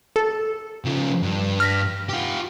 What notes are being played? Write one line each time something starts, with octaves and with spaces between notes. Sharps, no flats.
A4
C#3 F3
G2
F6 A#6 B6
F4 G4